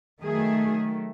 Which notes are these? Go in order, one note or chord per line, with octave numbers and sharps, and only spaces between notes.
D#3 F#3 A3 G#4